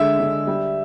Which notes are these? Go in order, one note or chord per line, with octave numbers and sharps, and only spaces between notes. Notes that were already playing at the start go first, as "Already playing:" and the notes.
Already playing: D3 G#3 E5
D3
G3